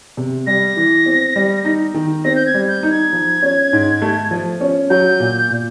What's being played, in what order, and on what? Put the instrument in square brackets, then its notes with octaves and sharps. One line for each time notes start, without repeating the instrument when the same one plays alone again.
[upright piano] C3
[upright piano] G3 [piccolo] A#6
[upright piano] E3
C4
G3
D#4
D#3
[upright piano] C4 [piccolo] A#6
[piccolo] G6
G#6
[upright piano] G3
[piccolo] G6
[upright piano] D#4
[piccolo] G#6
[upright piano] F3
C#4
G#2
A3
F3
C#4
[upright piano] F#3 [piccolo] G6
[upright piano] A#2
A#2